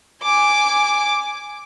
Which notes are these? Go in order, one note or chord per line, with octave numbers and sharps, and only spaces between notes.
G#5 D6